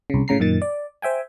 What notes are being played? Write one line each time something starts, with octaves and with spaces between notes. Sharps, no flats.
C2 C#3
A2 C#3 A#5 C7
F#2 A#2 D#3 A6
D5
C5 E5 G5 G#5